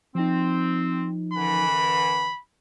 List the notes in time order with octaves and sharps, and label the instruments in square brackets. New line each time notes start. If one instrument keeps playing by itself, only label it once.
[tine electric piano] F3 D#4 [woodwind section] C4
[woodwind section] F#2 D3 E3 [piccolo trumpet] B5